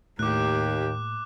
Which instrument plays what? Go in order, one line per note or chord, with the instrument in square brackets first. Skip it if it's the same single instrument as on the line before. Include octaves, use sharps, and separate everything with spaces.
[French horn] D#2 [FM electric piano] A2 [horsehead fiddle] A#3 G4 [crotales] D6 F#6